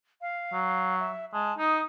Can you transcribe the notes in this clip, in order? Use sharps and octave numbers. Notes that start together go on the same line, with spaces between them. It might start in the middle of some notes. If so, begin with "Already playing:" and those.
F5
F#3
E5
G#3 A5
D#4 D#6